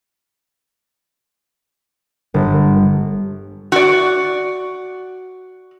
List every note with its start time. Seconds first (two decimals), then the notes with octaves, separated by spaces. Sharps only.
2.34 G1
3.72 F#4 D5